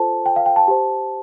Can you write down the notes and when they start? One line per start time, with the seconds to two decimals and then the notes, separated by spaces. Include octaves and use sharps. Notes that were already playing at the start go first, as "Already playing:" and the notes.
Already playing: F4 A4 C5 A5
0.26 G5
0.36 F5
0.46 G5
0.56 A5
0.68 G4 C5